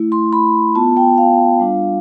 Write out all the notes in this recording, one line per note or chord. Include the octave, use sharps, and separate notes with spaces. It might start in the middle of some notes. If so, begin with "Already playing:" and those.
Already playing: A3 E4
C6
B5
B3 F4 A5
G5
F5
G3 D4 F4